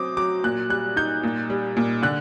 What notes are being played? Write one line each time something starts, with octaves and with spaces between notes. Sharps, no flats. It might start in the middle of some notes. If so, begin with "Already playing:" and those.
Already playing: F#3 C4 D6 D#6
F#3 D6
A#2 F#6
G3 F#6
D#4 G6
A#2
G3
A#2
D3 F#6